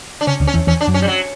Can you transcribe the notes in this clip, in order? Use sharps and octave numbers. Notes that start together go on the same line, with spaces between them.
D4
C#3 C#4
D2 D3
C#4
E2 E3
E2 E3 C#4
D4
F#2 F#3
C#4
G3
F#3